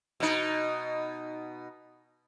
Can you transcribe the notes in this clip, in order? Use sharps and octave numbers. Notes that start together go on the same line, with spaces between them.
B2 D#4